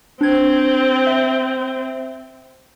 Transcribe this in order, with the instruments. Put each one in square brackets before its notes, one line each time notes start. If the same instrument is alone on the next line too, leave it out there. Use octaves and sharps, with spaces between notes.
[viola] C4 [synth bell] D4 G#6
[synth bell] E5